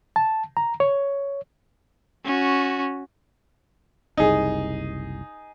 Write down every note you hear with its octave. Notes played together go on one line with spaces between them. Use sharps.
A5
A#5
C#5
C#4 F#4
F#1 C2 D#4 G#4